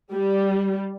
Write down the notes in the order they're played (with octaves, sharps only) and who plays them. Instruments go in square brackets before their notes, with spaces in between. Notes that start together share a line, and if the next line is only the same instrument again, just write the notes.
[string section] G3